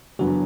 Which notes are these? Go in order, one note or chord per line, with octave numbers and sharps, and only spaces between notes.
F#1 E2 D3 F#3 B3 F#4